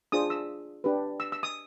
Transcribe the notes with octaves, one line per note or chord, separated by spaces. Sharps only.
D4 F4 G#4 C5 D#6
E6
D4 G4 B4
E6
E6
D#6